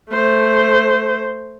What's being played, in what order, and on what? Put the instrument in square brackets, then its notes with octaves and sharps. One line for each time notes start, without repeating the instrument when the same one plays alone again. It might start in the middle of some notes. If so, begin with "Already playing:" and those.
[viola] A3 C5